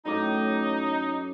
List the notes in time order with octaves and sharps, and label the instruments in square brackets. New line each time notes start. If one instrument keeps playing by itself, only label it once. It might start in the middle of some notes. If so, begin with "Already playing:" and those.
[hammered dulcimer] F#2 A2 D6 [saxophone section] D#4